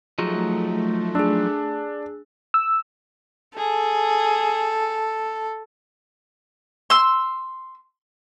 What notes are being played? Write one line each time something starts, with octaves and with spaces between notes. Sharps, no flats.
F3 F#3 A3 D#4 G#4
D4 G#4 E6
E6
G#4 A4
C6 E6